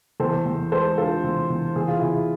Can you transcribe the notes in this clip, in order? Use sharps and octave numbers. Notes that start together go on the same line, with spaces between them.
E2 A4 C5
E2
G#3 A4 C5
D3 F4 A4
E2
E2
E2 G#4
F4
E2 E4 G#4